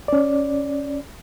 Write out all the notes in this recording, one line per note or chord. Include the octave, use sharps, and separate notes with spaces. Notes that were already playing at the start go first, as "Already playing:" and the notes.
C#4 D5